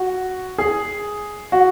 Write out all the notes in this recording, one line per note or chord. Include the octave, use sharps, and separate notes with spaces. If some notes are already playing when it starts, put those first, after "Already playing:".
Already playing: F#4
G#4
F#4